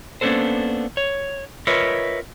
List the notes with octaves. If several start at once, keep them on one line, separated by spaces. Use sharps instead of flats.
A#3 B3 C#4 D4 A4 C5
C#5
F4 A#4 B4 C#5 D#5 E5